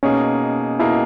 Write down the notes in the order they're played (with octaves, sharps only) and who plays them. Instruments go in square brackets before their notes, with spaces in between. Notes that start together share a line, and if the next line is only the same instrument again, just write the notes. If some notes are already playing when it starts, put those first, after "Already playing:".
[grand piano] B2 A#3 D#4 G#4 [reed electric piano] C#4
[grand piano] B2 A#3 D#4 G#4 [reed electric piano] E4